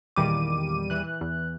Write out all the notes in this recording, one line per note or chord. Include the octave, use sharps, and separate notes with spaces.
E2 A#2 D#3 G3 D6 D#7
E3 F#6
E2